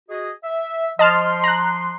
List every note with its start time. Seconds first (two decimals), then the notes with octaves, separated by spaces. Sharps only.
0.09 F#4 G#4 D#5
0.44 E5
0.99 F3 D#5 A5 C6 F6
1.44 A#5 F#6